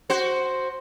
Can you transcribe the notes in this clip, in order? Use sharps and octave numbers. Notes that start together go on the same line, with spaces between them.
F#4 C5